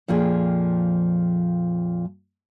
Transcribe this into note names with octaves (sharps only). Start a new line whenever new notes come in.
F2 A#2 F3 G#4 G5